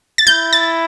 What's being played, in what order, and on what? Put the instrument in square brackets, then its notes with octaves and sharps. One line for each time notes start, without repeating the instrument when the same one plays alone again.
[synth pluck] A6
[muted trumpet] E4 [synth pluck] G6
[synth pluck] A6